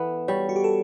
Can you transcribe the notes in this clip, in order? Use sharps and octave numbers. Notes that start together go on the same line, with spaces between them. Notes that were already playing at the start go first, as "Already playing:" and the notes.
Already playing: E3 B3 A4
G3 C#5
F#4
G4
A4